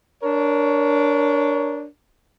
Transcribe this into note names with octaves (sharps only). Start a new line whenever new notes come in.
D4 A#4 C#5